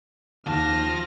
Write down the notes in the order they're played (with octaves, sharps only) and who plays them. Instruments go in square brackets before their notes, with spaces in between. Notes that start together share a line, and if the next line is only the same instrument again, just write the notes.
[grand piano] D#2 [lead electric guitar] F3 A5 [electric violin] F6 A#6